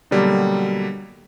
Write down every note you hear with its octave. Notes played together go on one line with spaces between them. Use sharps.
B2 D3 F#3 G3 A#3